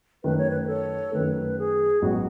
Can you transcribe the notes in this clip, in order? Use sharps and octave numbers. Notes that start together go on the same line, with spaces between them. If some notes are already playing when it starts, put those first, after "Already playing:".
F#2 D#3 A3 B4
C#5
B4
B4
A4 C#5
F#2 D#3 A3 B4
G#4
A1 G#2 F#3 B3 F#4